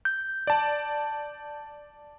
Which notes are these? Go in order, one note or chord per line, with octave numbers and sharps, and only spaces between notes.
G6
D5 A5